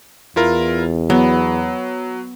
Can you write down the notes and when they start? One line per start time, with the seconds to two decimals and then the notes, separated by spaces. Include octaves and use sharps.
0.36 E2 E4 F4 A#4
1.10 F#3 B3